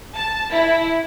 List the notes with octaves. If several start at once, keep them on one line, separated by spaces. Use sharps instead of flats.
A5
E4